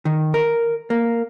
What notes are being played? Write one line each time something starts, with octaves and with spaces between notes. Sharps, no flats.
D#3
A#4
A#3